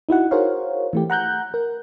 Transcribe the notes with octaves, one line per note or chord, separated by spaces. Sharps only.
D#4 E4 F#4 F#5
F#4 G#4 A#4 C5 C#5 F5
E3 A3 G4
F#5 A#5 F#6 G6
A#4